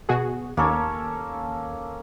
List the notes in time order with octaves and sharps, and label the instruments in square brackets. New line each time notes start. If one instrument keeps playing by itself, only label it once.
[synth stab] B2 F#4 G#4
[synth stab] D#2 [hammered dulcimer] A#3 C#4 A4